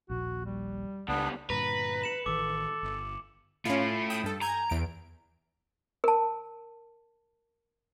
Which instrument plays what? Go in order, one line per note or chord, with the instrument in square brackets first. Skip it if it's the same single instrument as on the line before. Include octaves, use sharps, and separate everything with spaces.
[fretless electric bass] D#1 A#1 [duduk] F#4
[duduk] G3
[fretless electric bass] C#2 [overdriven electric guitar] B2 G3 [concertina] B3 D4
[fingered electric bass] G2 A#2 D3 [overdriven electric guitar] B4 [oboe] A#5
[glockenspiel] C#7 E7 F#7
[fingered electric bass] A1 D#3 E3 [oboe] A4 [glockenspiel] D6
[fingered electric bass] G1
[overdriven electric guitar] A3 E4 [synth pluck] C#4 F4
[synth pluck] G5 B5 D#6
G2 A4
[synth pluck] G#5 G6 G#6 [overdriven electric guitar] A#5
[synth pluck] E2 D7
[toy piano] A#4 A5